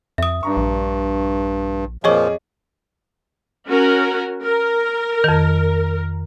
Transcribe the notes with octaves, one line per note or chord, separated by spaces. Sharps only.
F2 E5 D#6
G2 D4 A#5 C#6
A#1
F2 A#2 F3 G#4 C#5 D#5 C#6 D6
C#4 F#4 A#4
A#4
F2 D#3